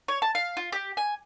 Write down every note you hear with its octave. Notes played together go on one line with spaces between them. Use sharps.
C#5
A5
F5
F4
G4
G#5